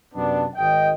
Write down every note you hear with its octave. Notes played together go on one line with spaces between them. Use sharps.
F#2 C3 B3 D4
G#1 D#5 G5